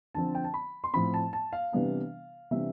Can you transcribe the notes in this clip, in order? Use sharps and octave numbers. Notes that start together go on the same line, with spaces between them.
D3 F3 C4 A5
G5
A5
B5
C6
A2 F3 C4 B5
A5
A5
F5
C3 E3 G3 B3 D4
C3 E3 G3 D4 E5